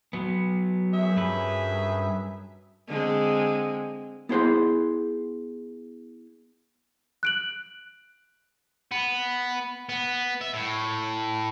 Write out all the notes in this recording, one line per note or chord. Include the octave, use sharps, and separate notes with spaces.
F#3 B3
F#2 G#4 E5
G2 B4
D3 G#3 C4
B3 E4 G#4 C5 F#5 C6
F#6 D7 F#7
B3
B3
E5
A2